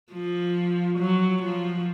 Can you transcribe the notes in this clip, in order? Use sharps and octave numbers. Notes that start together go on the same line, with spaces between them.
F3
F#3
F3